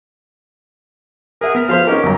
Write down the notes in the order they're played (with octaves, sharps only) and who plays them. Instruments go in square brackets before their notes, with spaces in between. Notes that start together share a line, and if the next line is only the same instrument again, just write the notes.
[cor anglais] G#4 [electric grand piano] A#4 E5 F#5
[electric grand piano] B3 B6 [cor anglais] A#4
[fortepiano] F3 B4 C5 [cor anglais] F5
[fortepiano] C#4 D#4 A#4 [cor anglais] G4
[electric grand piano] G1 F#2 A#5